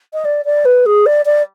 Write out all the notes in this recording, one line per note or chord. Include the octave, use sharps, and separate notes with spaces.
D#5
D5
D5
B4
G#4
D5
D5